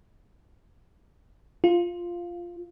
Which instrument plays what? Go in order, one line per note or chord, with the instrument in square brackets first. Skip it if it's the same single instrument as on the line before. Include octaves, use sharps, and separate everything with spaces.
[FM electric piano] F4